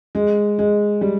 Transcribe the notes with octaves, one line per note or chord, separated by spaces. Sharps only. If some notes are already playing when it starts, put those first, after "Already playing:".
G#3
G#3
G3